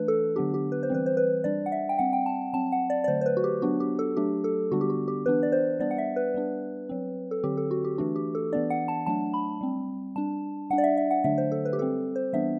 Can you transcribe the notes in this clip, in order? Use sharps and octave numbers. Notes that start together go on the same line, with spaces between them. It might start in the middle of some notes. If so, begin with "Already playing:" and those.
Already playing: E3 A3 D4 B4
A4
D3 F#3 B3 D4 G4
G4
B4
C5
E3 G3 C4 B4
C5
B4
G3 D4 D5
F#5
E5
G5
G3 C4 F#5
G5
A5
F#3 C4 A5
F#5
D5
D5
D3 F#3 A3 C5
C5
B4
F#4
G4
F#3 B3 D4 F#4
G4
A4
F#3 A3 D4 G4
A4
D3 G3 B3 D4 F#4
G4
F#4
G4
E3 B3 D4 B4
D5
C5
G3 B3 D4 D5
F#5
E5
B4
G3 B3 D4
F#3 C4
A4
D3 F#3 C4 G4
A4
F#4
G4
E3 A3 D4 F#4
G4
A4
E3 B3 D4 D5
F#5
A5
F#3 A3 D4 A5
B5
G3 C4
G3 D4 A5
G3 D4 F#5
D5
E5
E5
F#5
D3 F#3 A3 D4 E5
C5
A4
B4
G4
G3 C4 A4
C5
E3 G3 B3 D4 E5